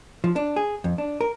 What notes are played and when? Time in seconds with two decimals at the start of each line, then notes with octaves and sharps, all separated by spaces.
0.24 F3
0.36 D4
0.56 G#4
0.84 F2
0.98 D4
1.21 A#4